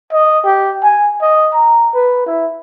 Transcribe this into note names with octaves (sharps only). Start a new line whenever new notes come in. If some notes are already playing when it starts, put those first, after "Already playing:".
D#5
G4
G#5
D#5
A#5
B4
E4